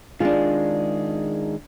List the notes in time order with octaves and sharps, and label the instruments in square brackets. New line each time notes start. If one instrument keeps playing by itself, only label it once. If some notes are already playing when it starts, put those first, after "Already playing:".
[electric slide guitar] D#3 G#3 G#4 [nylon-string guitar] D4 F4